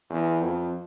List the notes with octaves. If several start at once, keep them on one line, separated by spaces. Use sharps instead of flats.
E2
F2